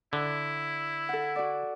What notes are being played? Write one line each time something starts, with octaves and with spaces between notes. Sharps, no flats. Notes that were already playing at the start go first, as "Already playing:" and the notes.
D3 E4
A4 F#5
F#4 D5